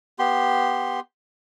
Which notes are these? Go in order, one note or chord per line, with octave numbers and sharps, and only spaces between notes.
B3 G4 C6